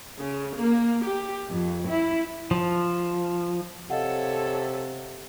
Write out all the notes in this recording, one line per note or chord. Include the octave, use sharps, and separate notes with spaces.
C#3
A#3
G4
F2
E4
F3
C3 A4 C#5 D#5 F5 F#5